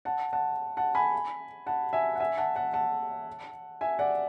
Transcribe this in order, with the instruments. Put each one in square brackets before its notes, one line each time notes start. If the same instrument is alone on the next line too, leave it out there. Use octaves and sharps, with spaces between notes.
[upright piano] F#5 A5
F#5 A5
F#5 A5
G#5 B5
F#5 A5
E5 G#5
F#5
E5 G#5
F#5 A5
F#5 A5
F#5 A5
E5 G#5
D5 F#5